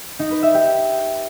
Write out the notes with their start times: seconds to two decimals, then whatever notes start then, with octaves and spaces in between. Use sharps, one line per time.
0.19 D#4
0.31 B4
0.43 E5
0.54 G4